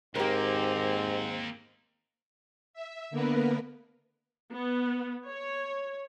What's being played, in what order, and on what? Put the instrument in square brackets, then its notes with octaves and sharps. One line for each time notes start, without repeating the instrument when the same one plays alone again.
[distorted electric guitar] D#2 A#3 [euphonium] G#2 [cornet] C4 [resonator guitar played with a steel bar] G4 A#4
[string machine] E5
D3 A#3 B3 A#4 B4
[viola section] B3
C#5